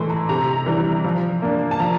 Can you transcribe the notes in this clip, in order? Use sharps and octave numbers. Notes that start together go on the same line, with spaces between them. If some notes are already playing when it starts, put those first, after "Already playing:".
Already playing: A2 E3 A3 E4 A5 C6
A#5
C3 A#5
E3 G3
F3
A#3 D4
A5
F3 A#5